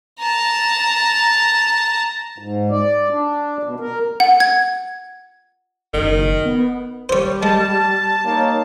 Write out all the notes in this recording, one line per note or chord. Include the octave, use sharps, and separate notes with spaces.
A5 A#5
G#2
D5
D4
B2
A#4
F#5
G#6
F#1 D#3
B3
G3 C5 C#5
G#3 A5
A#3 D#4 C#5